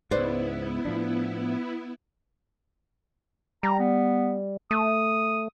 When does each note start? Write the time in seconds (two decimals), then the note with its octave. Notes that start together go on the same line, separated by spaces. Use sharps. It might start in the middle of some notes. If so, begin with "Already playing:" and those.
0.11 C#2 G#2 B3 E4 B4 C5 D5
0.85 A2 F3 D4
3.63 G3 A#5
3.79 B3
4.71 A3 D#6